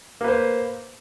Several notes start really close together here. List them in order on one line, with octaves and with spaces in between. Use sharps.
A#3 B4 C5